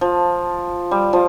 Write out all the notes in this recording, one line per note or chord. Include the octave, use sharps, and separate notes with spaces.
F3
G3
F3